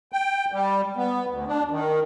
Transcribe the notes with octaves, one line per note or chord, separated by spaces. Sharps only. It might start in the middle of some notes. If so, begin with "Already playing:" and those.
G5
G3
B3
D2
D4
D#3